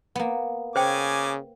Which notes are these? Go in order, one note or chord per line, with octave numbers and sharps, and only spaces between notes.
A#3 B3
C#3 C5 G5 G#5 D6